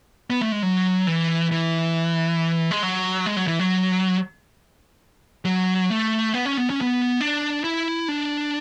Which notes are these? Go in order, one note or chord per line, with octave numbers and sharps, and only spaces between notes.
B3
A3
G#3
F#3
E3
E3
G#3
F#3
G#3
F#3
E3
F#3
F#3
A3
B3
C#4
B3
C#4
B3
D4
E4
D4